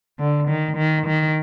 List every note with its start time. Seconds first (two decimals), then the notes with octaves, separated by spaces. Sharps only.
0.20 D3
0.49 D#3
0.77 D#3
1.07 D#3